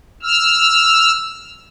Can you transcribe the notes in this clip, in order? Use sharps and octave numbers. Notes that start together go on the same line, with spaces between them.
E6 F6